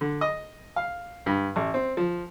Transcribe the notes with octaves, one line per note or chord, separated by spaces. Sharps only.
D3
D#5
F5
G2
A1
C4
F3